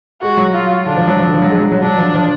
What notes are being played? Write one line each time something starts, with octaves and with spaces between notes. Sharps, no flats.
G#3 F#4
F#3
F4
D3 D4
F3
F#3
F3
D3
F3
F#3
G#3
F#3
F#3
F#3 D4
F3
F3